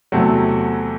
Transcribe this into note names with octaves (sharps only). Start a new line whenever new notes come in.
E2 C3 F#3 A3